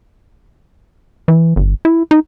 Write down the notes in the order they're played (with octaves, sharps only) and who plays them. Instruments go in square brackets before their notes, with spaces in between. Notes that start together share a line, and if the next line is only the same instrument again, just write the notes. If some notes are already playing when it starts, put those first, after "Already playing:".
[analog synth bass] E3
G1
E4
D#4